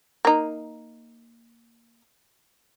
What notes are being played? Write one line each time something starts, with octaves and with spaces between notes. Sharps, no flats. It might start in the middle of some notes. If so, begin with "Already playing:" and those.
A#3 D#4